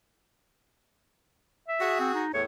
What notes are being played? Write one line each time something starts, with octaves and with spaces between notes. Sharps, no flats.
E5
F#4 G#4
C4
D#4
E2 A2 C#5